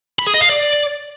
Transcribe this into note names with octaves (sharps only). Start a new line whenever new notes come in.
B5
G#4
D#5
F5
D5